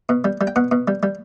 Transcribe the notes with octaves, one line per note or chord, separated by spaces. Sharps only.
B2
G3
G3
G5
B2 F#5
B2
G3
G3